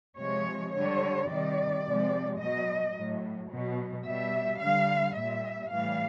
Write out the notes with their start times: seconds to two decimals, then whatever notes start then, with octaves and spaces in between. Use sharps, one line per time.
0.18 C3 F3 G#3 C#5
0.74 D3 G3 C#5
1.29 C3 D#3 G3 D5
1.85 C3 F3 G#3
2.39 B2 F#3 D#5
2.95 A2 F#3
3.50 B2 F#3
4.05 B2 G3 E5
4.60 D3 G3 F5
5.16 A#2 G3 E5
5.71 A2 E3 G3 F5